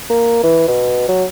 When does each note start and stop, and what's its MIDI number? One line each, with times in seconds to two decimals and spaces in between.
0.10 0.39 58
0.43 0.65 52
0.68 1.08 47
1.09 1.25 54